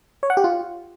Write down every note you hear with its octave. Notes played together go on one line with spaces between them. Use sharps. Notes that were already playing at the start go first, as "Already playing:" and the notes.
C#5
F#5
G4
F4